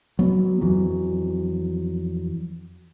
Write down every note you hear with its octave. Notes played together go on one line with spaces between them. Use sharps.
F#3 B3
F2 E3 F#3